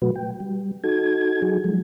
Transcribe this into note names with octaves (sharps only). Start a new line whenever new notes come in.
B2 F#3 A3 F#4 B4
G5
G3
D#4 F#4 A4 G#6
F#3 D#4 F#4 G#4
F3 F#3 G#3